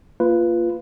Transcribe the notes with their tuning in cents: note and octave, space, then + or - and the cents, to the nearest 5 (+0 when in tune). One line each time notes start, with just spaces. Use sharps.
A#3 +0 F4 -15 B4 +0